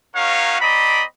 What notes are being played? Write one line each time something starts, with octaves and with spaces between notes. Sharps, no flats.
C#4 D#4 F#4 A#4 C#5 F5
C4 D5 D#5 A#5 B5